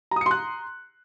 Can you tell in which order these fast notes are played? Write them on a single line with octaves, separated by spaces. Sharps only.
A#5 D#6 C#7 C6 F#6